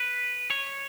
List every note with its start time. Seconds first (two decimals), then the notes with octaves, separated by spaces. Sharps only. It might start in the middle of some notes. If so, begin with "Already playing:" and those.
Already playing: B4
0.50 C#5